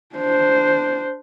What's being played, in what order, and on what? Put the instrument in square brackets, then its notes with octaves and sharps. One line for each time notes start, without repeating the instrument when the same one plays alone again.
[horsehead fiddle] D4 C5